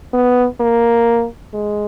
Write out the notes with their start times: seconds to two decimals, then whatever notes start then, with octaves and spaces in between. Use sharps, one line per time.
0.14 B3
0.61 A#3
1.55 G#3